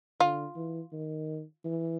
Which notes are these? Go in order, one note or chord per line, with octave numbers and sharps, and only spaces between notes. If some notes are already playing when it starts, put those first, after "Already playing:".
D3 F4
E3
D#3
E3